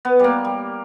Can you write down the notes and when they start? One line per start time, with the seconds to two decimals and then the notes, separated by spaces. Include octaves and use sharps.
0.05 B3
0.19 G3 A#3
0.45 G3